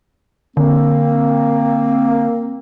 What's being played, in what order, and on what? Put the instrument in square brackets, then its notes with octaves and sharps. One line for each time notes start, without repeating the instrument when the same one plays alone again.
[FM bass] D3 [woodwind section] A#3 C4